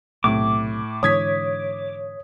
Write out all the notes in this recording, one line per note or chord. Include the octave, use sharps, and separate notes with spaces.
B1 A2 C3 D6
G#2 D3 E3 C#5 D#6 G#6 B6